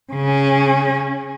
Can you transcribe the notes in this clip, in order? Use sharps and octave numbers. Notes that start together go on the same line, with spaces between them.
C#3 C#4